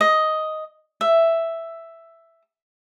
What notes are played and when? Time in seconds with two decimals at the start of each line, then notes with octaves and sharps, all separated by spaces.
0.01 D#5
1.01 E5